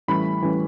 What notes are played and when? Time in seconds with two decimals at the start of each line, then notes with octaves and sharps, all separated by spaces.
0.08 A2 E3 G3 C#4 B5
0.42 A2 E3 G3 C#4